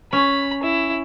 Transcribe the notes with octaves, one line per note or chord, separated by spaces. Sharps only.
C#4 B5
E4